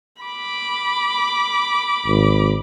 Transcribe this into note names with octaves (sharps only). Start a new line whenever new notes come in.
B5 D6
G#1